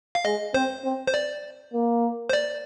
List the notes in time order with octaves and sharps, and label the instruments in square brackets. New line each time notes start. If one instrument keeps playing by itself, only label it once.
[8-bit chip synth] F5
[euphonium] G#3 [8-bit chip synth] D#5
[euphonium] C4 [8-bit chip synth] C5
[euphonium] C4
[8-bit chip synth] C5
D5
[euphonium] A#3
[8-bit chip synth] C5
D5